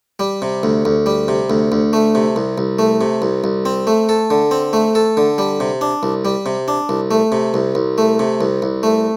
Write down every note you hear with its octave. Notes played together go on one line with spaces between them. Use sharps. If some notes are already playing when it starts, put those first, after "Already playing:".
G3
C3
D2
D2
G3
C3
D2
D2
A3
C3
C2
C2
A3
C3
C2
C2
C4
A3
A4
D3
C4
A3
A4
D3
G3
C3
D4
C2
G3
C3
D4
C2
A3
C3
C2
C2
A3
C3
C2
C2
A3